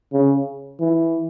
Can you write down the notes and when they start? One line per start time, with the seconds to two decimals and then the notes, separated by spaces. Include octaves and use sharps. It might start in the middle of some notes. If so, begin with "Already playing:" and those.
0.13 C#3
0.80 E3